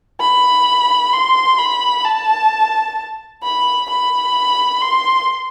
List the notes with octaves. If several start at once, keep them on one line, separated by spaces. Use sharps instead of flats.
B5
C6
B5
A5
B5
B5
C6